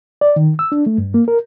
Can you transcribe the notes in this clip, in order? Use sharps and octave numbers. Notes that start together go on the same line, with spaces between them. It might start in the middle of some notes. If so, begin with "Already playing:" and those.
D5
D#3
E6
D4
A3
G2
A#3
A#4